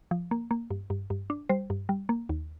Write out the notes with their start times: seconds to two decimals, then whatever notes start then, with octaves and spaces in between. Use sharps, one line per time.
0.11 F3
0.31 A#3
0.51 A#3
0.70 G2
0.90 G2
1.10 G2
1.30 D4
1.49 G3 C5
1.70 G2
1.89 G3
2.09 A#3
2.29 D#2